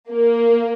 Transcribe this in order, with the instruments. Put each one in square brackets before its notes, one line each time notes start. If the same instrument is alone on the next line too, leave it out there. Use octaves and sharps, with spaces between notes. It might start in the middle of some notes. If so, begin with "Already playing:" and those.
[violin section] A#3